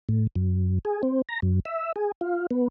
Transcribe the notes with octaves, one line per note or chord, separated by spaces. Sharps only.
A2
F#2
G#4
C4
A#5
F#2
E5
G#4
F4
B3